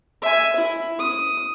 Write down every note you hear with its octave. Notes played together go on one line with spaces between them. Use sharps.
E5 G#5
E4
D#6